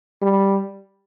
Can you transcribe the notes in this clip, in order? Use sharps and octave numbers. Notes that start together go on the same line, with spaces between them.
G3